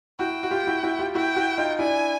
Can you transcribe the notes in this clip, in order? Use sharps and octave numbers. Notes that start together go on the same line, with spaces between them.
E4 F#4 G5
F#4
F4 G4
E4 F#4
E4 F#4
F4 G4
E4 F#4 G5
E4 F#4
D#4 F4
D4 E4 G#5